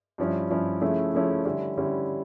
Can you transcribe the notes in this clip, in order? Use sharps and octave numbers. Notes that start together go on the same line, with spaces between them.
G2 F3 C#4 E4
G2 F3 C#4 E4
C#3 F3 A3 C#4 E4
C#3 F3 A3 C#4 E4
D3 G3 C#4 E4
D3 G3 C#4 E4